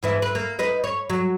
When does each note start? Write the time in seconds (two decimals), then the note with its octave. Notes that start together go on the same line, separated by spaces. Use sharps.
0.03 G#2 E3 E4
0.22 B4
0.35 A#3
0.59 D#4 B4 D#5
0.84 C#5
1.10 F#3